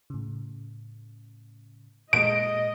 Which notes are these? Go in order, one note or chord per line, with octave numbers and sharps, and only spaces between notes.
A2 C#3
A#2 G#3 D#5 D7